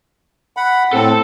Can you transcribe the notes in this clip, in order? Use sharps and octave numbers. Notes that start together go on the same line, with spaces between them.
F#5 B5
A2 C4 A4 A5